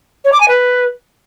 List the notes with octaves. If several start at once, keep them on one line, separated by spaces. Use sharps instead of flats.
C#5
D6
G#5
B4